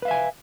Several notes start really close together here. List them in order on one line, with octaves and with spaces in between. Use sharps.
B4 F5 E5 G#5